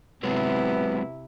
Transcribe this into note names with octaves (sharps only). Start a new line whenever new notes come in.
C3 F#3 G#3 B3 C4 E4